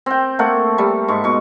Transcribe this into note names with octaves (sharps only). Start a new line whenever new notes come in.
C4 G5
A3 A#3 A4 F#5
G3
G#2 C#6
B2 C#6